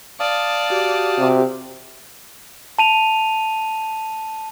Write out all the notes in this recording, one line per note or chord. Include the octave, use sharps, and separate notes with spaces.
D5 F5 A5 D#6
F#4 G4
C3
A5 D#7 F7